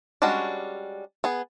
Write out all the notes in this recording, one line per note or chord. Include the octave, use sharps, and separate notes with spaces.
G3 G#3 C#4 D4 F#4
B3 G#4